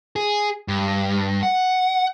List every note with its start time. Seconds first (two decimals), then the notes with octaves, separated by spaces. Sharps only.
0.16 G#4
0.68 G2
1.43 F#5